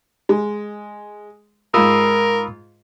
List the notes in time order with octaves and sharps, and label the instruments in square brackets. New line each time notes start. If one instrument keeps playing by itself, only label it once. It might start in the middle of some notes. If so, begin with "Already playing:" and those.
[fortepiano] G#3
[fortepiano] G#2 F4 [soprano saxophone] A#4 [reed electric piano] B5 D#6 E6